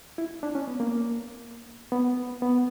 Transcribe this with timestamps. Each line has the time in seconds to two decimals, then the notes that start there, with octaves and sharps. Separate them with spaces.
0.18 E4
0.43 D4
0.55 C#4
0.67 B3
0.80 A#3
1.92 B3
2.42 B3